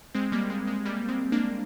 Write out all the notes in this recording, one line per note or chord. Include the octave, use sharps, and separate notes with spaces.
G#3 C4
G3 A#3
G#3
G#3
G3 A#3
G#3 C4
A#3 D4